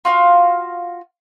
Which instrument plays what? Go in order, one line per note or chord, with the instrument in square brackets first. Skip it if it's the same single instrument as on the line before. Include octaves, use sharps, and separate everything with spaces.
[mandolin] F4 F#4 F5